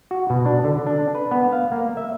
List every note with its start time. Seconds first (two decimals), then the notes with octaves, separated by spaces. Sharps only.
0.11 F#4
0.30 B2
0.46 D4
0.64 D3
0.86 D4
1.15 B4
1.31 B3
1.52 F5
1.72 A#3
1.97 E5